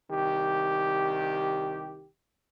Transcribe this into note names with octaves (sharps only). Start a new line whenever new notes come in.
C2 D#3 G4